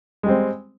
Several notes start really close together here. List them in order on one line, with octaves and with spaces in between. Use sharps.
G#3 G3 C4